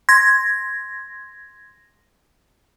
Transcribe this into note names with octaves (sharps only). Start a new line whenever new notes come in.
C6 G#6 A#6